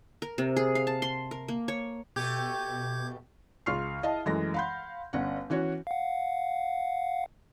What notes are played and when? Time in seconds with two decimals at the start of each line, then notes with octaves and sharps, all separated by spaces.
0.22 A#4
0.38 C3
0.57 G#4
0.75 F5
0.87 A5
1.02 C6
1.31 A#4
1.48 A#3
1.68 C#5
2.16 B2 A3 G4 D6 G6 G#6
3.66 C#2 F4 C#6 F6 C7
4.03 E4 D#5 F5 A5
4.26 F#2 E3 G#3 A3 A#6
4.54 F5 F#5 B5 C6 G6
5.13 G1 C#4 F#5
5.50 E3 C#4 F#4 C#5
5.87 F5 F#5